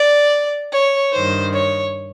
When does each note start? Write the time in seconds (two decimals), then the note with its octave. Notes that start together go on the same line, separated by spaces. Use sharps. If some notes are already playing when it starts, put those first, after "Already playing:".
Already playing: D5
0.72 C#5
1.12 G2 D#3 C5
1.52 C#5